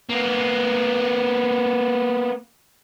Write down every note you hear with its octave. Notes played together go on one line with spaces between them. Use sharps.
A#3 B3